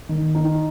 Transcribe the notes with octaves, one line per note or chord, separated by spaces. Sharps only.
D#3
D#4